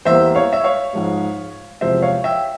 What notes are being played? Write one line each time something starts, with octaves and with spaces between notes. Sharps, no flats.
E2 E3 G3 A#3 C5 E5
C#5 F5
E5
C#5 F5
G#2 F3 G#3
E2 C3 F3 G#3 C5 E5
C#5 F5
E5 G5